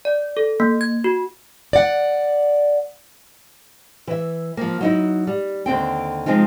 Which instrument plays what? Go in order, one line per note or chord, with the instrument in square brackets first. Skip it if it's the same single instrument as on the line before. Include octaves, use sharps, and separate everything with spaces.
[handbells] D5
A4
A#3
G#6
F#4
[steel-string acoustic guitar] D5 F#5
[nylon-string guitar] E3 E5
F3 A#3
F#3 D#4 E4
G3
D#2 D3 C4 G5
C3 F3 G#3 C4 D#4 F4